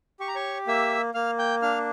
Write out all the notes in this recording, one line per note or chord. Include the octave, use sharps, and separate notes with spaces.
G4 C#6
A#5
C#5 C#6
A#3 E5 E6
A#3 F5 F6
G5 G6
D4 F5 F6